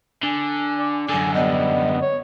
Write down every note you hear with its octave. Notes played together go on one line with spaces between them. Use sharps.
D3 G#5
D5
F#2 D3 G#5
G3 B3 D#5
C#5